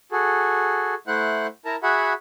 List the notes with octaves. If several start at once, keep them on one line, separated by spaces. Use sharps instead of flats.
F#4 G#4 A4
A3 E4 C5 F#5 F#6
E4 A#4 A5 A#5
F#4 G#4 E5 F#5 B5